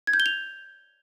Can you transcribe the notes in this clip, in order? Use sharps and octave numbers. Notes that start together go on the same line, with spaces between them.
G#6
G6
G7
F7